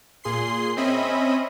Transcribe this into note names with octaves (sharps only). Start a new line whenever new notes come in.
A#2 G#4 C6 C7
C4 C#4 D#5 E5 B5